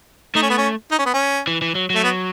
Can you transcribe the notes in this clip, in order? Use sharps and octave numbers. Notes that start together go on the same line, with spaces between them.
A3 D#4
C#4
B3
C#4
D#4
C#4
B3
C#4
E3
E3
F#3
F#3 A3
B3